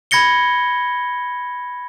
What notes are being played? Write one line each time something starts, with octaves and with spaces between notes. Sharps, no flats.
B5 G#6 A#6 C#7 G7